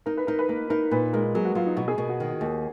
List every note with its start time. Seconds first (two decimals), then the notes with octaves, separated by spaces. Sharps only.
0.06 D#4 A#4
0.17 B4
0.27 D#4 A#4
0.39 B4
0.49 A#3 A#4
0.70 D#4 A#4
0.91 A#2 B4
1.13 G#3 A#4
1.35 F#3 G#4
1.45 F#4
1.55 F#3 F4
1.67 D#4
1.76 B2 F#4
1.88 G#4
1.98 B2 A#4
2.09 F#4
2.20 D#3
2.41 D#2